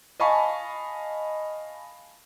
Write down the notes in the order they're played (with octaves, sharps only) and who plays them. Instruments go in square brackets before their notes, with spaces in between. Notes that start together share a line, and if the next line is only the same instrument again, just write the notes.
[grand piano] D#5 F5 G#5 A5 B5 C#6